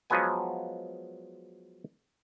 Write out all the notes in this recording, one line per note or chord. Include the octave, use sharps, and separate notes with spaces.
F3 F#3 G#3 B3 G#5